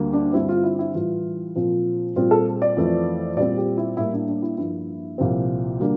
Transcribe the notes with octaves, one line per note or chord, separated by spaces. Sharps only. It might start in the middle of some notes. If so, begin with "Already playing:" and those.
Already playing: D2 D3 G3 A#3
D4
G2 D3 G3 C4 E4
F4
E4
E4
A2 E3 G3 F4
A#2 F3 C4
A#2 G3 C4 F4
A4
D5
F2 E3 A3
A#2 G3 C4 D5
G4
E4
A2 G3 A#3 E4
D4
D4
E4
G2 F3 A#3 E4
C2 A#2 F3 C4
D3 G3 A#3